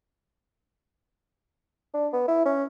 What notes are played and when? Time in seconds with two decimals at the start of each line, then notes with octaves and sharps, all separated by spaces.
1.94 D4
2.13 B3
2.28 E4
2.45 C#4